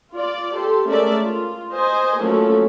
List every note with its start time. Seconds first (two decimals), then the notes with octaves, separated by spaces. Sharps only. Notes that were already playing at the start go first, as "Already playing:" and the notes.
0.14 F4 D5
0.56 G4 A4 C6
0.88 G#3 A3 C#4 A#4 D5 E5
1.24 F4
1.74 C5 D#5 G#5
2.21 F3 F#3 A3 A#3 C#4 A4